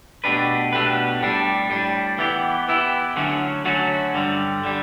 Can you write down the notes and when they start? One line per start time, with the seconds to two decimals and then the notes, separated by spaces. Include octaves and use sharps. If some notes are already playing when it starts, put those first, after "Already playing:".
0.24 B2 A3 D4 G4 B4
0.73 B2 A3 D4 G4 B4
1.21 A2 G3 D4
1.70 A2 G3 D4
2.18 E3 B3 E4 G4
2.68 E3 B3 E4 G4
3.16 D3 F#3 A3 C#4 F#4
3.65 D3 F#3 A3 C#4 F#4
4.14 G2 D3 G3
4.65 D3 G3